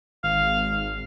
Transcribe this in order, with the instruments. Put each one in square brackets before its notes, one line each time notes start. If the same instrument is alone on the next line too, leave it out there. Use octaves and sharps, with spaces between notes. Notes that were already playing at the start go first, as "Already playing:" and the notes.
[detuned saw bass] G#1 [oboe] F5